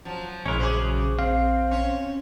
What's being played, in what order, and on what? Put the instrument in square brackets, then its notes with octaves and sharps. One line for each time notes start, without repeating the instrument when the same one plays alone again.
[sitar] F3 F#3
[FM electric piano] A#1 [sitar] G#3 E4 [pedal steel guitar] C#4 A#4
[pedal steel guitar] C#3 F#3 D6 [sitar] G#4 C5
[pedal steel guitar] C4 [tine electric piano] F5
[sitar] C#4 C#5